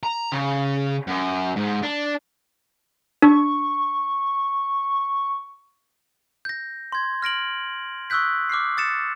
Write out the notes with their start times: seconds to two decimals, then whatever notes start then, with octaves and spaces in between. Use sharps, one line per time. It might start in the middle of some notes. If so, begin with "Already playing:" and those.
0.03 A#5
0.32 C#3
1.07 F#2
1.56 G#2
1.83 D4
3.22 D4 C#6
6.45 G6 A#6
6.92 C6 G#6
7.22 F6 A#6 D7 F#7
8.10 C#6 D#6 E6 F#6 G6 B6
8.49 D6 F6 G6 C7
8.77 D#6 A6 C#7 E7